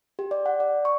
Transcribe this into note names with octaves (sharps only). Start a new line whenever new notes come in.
G4
D5
F#5
D5
C#6